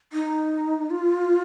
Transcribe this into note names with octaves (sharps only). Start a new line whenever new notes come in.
D#4
F4